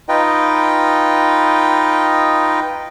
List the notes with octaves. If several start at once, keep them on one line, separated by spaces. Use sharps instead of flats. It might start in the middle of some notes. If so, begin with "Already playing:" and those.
D#4 F4 B4 D#5 G5